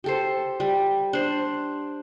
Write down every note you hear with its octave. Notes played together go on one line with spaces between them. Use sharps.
G4 A4 C5
G3
D4 C5